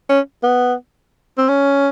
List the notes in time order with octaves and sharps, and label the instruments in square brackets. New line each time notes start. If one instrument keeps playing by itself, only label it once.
[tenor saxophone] C#4
B3
C4
C#4